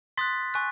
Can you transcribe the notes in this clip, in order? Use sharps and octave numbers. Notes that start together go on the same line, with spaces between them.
C6 D#6 F#6 A6 B6
G#5 C#6 F#6